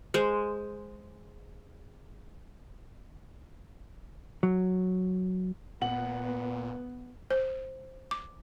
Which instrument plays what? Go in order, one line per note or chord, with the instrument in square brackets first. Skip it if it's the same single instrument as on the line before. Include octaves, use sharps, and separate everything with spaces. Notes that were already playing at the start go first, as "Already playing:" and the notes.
[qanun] G#3 C5
[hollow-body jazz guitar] F#3
[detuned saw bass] A#2 [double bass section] B3 [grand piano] F#5 F#7
[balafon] C5
D6